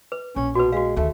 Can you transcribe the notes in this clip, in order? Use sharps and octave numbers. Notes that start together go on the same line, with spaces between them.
B4
A#1 C#4
B2 F#4 B4
G#3 F#4 F5
D2 D#3 A3